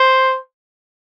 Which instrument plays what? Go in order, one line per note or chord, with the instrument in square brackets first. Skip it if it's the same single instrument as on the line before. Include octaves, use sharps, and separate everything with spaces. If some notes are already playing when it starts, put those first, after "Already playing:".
Already playing: [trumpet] C5